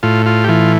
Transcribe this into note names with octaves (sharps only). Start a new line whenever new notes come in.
A2 F4
F4
G4
E3 F4